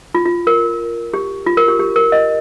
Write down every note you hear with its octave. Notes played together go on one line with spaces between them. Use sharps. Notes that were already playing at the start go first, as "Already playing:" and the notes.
F4
F4
A#4
G4
F4
A#4
G4
G4
A#4
D#5